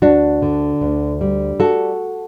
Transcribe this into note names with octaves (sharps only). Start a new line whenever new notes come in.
D2 D4 F#4
D3
D2
G3
F#4 A4